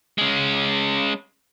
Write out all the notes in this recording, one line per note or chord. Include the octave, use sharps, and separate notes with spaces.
G#3 C#4